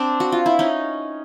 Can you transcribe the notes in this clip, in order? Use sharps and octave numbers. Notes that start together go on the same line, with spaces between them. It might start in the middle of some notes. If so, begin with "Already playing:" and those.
Already playing: C4 D4
F#4
F4
E4
C#4 D#4